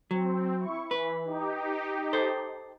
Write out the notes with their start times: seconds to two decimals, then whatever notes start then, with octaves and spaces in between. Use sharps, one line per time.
0.11 F#3 C4
0.58 E4 C#6
0.91 E3 B4
1.25 D#4 G4
2.13 A4 C5